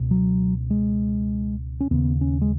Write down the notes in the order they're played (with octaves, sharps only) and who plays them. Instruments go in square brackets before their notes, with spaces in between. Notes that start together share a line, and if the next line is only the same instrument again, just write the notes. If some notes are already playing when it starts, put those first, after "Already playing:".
Already playing: [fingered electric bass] C#2 B2
F#3
G#3
C#4
D#2 C#3 B3
C#4
G#3